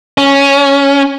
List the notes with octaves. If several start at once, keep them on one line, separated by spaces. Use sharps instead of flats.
C#4